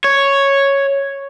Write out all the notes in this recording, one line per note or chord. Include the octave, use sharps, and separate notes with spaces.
C#5